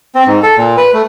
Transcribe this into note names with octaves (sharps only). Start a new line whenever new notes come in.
C4
G#2
A4
A#2
B4
A3